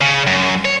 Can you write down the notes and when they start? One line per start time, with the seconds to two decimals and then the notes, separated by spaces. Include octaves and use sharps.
0.01 C#3
0.27 F#2
0.65 C#5